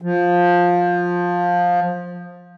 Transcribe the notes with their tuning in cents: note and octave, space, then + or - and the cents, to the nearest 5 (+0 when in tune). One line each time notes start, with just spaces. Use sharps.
F3 +15